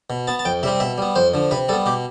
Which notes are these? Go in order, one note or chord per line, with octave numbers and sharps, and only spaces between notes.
B2
B3 A5
A5
F2 G5
C3 G3 C4 E5
B2 E5
G3 B3
F2 C5
D3 F3
C3 B4
G3 B3 A4
B2 G4